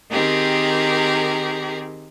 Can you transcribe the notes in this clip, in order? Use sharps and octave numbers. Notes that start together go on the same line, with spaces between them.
D#3 C4 G4 G#4 A#4